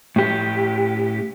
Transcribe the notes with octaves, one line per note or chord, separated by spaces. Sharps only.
A2 G4